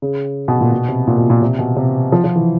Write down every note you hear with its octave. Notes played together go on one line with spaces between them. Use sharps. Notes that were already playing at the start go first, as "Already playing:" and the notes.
C#3
B2
A#2
B2
C3
A#2
B2
A#2
C3
B2
C3
F3
F3
E3